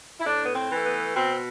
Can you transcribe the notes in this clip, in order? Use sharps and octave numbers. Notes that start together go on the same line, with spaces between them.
E4
A2 D4
B3
C4
E3 A3
B3
B2 C4